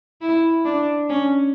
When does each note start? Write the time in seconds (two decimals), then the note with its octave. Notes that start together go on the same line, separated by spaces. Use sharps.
0.21 E4
0.65 D4
1.09 C#4